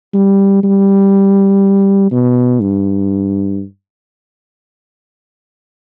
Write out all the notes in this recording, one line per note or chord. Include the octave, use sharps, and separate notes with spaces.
G3
G3
B2
G2